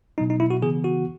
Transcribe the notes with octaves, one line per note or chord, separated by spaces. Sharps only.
B2 F#3 B3 D#4
D#4
E4
F#4
C#3 E3 B3 G#4
F#4